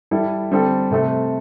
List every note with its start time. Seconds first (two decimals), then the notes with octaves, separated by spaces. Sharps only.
0.11 G3 E4 A4
0.51 D3 G3 C4 A4
0.91 C3 A3 C4 A4